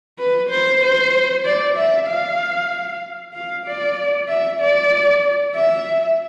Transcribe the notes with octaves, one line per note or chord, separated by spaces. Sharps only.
B4
C5
C5
D5
E5
F5
F5
D5
E5
D5
E5